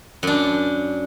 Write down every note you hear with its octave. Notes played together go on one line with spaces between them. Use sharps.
F#2 D4